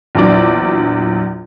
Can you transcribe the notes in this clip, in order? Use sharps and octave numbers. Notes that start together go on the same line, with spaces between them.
A#1 E2 F#3 D4 D5